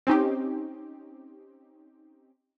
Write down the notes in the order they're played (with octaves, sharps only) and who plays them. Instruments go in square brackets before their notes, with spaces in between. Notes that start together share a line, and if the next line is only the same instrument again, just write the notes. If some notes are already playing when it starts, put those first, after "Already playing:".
[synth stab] C4 C#4 D#4 G4